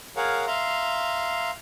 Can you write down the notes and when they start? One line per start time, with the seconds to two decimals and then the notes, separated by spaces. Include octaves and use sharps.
0.17 G#4 A#4 C#5 F5 F#5
0.47 E5 F5 A#5 C6